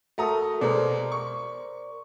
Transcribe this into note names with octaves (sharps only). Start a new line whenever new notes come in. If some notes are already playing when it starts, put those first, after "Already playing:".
A3 F#4 A4 A#4 A#5 D#6
B2 G#3 A#4 C5 D5
C#6